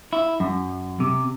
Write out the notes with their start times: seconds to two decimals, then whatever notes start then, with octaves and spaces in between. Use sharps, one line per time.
0.13 E4
0.40 F#2
1.00 C3